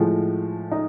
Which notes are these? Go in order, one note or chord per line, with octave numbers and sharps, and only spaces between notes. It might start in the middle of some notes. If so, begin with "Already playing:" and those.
Already playing: A2 F3 G#3
D#4